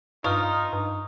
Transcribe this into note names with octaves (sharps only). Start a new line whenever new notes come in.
G2 D#4 F4 C#6 D#6 F6
G2